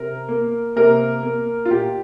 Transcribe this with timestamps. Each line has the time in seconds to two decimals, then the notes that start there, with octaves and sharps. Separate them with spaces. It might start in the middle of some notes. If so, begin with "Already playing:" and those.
Already playing: C3 A#4
0.29 A#3
0.76 C3 A#3 A#4
1.23 A#3
1.65 F4
1.71 A#2 G4